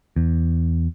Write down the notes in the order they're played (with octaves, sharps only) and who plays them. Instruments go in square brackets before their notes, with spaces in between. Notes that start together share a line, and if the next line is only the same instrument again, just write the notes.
[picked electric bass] E2